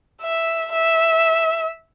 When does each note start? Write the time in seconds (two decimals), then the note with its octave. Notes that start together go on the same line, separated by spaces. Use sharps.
0.22 E5
0.72 E5